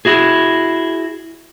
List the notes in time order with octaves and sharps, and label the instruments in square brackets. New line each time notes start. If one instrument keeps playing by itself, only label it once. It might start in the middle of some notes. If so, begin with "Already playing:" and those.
[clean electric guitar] E4 F#4 G#4